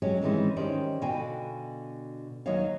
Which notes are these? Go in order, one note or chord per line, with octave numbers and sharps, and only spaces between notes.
F#3 G#3 C#4 G4
D#3 E3 G3 G#3 C4 C#4
D#3 C#4 G4 C5 D5
B2 D3 F#4 F5 G5 G#5
D#2 F#3 D#4 F#4 C#5 F5